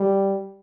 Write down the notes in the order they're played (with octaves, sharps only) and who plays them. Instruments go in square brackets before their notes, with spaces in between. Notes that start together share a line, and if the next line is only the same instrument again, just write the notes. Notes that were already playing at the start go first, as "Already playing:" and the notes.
Already playing: [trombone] G3